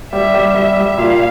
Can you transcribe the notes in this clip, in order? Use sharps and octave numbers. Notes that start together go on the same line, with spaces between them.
G3 E5
G3
G3 E5
G3
A#2 F5